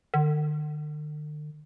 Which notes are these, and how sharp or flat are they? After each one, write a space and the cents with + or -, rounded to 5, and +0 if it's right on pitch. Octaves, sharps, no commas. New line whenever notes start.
D3 +45